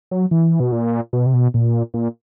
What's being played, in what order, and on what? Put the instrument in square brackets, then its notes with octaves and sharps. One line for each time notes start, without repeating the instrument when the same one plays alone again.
[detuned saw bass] F#3
E3
B2
A#2
B2
C3
B2
A#2
A#2